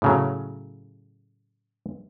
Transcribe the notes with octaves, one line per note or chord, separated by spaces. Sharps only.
A2 C#3 F#3